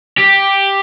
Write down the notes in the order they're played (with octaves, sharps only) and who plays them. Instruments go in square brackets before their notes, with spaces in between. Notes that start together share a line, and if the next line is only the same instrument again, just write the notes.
[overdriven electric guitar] G4